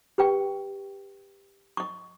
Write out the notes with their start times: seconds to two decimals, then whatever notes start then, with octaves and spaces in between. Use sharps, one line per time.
0.18 G4 B4 G5 C#6
1.77 D#5 C#6